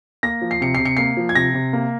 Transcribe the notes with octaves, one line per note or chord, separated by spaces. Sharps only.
A#3 A#6
F3
C7
C3 C#7
C3 C7
C#7
A#3 C7
F3
G#6
C3 A#6
C3
A#3